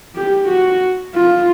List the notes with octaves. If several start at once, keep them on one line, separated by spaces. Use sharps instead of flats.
G4
F#4
F4